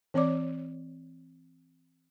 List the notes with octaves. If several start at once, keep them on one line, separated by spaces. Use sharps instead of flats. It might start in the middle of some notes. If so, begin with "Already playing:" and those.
E3 C4 C#5 D5 D6